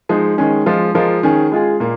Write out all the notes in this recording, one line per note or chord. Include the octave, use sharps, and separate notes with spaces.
F3 G#3 D#4
D#3 G#3 C#4
F3 G#3 F4
F3 G#3 F4 A#4
D#3 C#4 G#4
G#3 F4 G#4
A#2 A#3